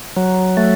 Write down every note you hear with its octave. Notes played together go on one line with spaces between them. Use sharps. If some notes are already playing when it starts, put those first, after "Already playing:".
F#3
A3